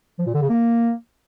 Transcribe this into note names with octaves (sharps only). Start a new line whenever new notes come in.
F3
A#2
D3
C#3
A#3